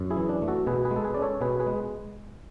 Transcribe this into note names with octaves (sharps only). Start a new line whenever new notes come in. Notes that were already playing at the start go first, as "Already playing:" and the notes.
Already playing: F#2
E4 G#4
E3
D4
A3
F#4 A4
B2 G#4 B4
G#4 B4
G#3
A4
G#4 B4
C#4 D5
A4 C#5
B2 G#4 B4
G#4 B4
G#3